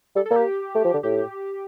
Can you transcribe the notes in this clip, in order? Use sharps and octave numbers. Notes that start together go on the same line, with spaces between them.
G3 A4
A4
A#3
G4
A3
F3
D3
A2 G4